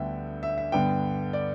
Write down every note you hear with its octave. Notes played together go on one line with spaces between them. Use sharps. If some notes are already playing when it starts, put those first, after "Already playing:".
Already playing: D2 D3 G3 B3 E5 G5
E5
E5
G2 D3 B3 G5
D5